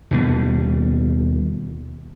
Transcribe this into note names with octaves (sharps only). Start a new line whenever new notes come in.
D#2 B2 G3